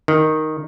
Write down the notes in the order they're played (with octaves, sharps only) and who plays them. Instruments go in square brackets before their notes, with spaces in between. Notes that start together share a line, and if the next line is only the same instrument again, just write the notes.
[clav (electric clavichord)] D#3